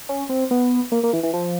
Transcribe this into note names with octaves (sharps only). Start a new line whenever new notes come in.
C#4
C4
B3
A#3
A#3
E3
E3
F3